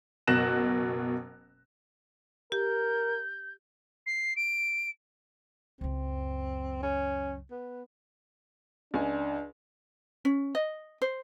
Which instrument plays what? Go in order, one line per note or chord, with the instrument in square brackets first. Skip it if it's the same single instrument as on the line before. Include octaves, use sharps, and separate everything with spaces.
[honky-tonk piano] F#1 B2 F#6 A#6 E7
[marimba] G4 [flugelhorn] A#4 [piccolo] G6
[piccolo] C7
D7
[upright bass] C#2 F#2 [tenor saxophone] C4
[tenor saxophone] C#4
B3
[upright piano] C#2 G#5 [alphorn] D4
[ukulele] C#4
D#5
C5